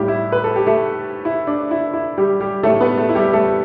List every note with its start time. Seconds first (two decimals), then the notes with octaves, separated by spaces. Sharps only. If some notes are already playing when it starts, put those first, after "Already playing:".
Already playing: B1 A2 G3 G4
0.08 E4
0.32 B4
0.44 A4
0.56 G4
0.67 A3 A4
1.25 E4
1.47 D4
1.71 E4
1.93 E4
2.18 G3 G4
2.40 G3 G4
2.63 B1 A2 G3 A3 A4
2.81 B3 B4
2.98 A3 A4
3.09 E4
3.15 G3 G4
3.33 A3 A4